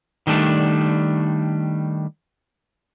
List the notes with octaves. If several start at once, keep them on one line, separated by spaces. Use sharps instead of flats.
D#3 G3 A3 D4